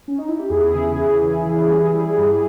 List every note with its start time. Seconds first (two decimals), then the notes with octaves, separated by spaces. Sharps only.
0.08 C#4
0.18 D#4
0.29 E4
0.39 G4
0.50 E2 E4 G#4
0.74 C#3
0.98 E3
1.22 C#3
1.46 E3
1.69 G3
1.93 G3
2.18 G2